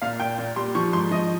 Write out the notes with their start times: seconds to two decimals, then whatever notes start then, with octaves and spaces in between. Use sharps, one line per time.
0.02 A#2 F5
0.20 A#2 G5
0.38 A#2
0.56 G3 C6
0.75 F3 C#6
0.93 G#2 C6
1.11 F3 D#5